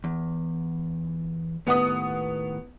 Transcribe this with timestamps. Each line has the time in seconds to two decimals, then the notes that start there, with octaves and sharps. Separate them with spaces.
0.04 E2
1.67 D#2 A2 B3 F#5 D#6